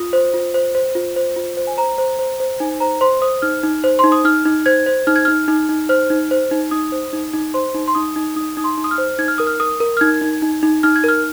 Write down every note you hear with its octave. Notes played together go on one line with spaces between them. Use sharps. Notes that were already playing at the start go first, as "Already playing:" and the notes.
Already playing: F4 D#6
C5
F4
C5
C5
F4
C5
F4
C5
G#5
C5 A#5
C5
C5
C5
D#4 G#5
C5 A#5
C5 C6
C5 D#6
D#4 F6
D#4
C5
D#4 C6
D#6
D#4 F6
D#4
C5 G#6
C5
D#4 F6
G#6
D#4 F6
D#4
D#4
C5 F6
D#4
C5
D#4
D#4 D#6
C5
D#4
D#4
C5 C6
D#4
C6
D#4 D#6
D#4
D#4 D#6
D#4 D#6
C6
D#4
D#6
F6
C5
D#4 G#6
F6
A#4 D#6
F6
A#4 D#6
A#4
F6
D#4 G#6
D#4
D#4
D#4
D#4 F6
G#6
A#4 F6